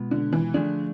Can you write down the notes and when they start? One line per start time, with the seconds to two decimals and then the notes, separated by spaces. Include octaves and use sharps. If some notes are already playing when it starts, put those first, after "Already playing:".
Already playing: B2 G#3 B3 F4 B4
0.11 D3
0.33 E3
0.54 D3 F3 A3 D4 G#4 D5